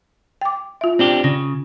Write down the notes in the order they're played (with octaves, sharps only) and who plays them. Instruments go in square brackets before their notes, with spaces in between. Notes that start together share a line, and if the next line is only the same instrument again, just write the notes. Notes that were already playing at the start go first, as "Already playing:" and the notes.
[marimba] G5 D6
F4 E5
[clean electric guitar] C4 D4 G4
[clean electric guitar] C#3 [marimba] A#6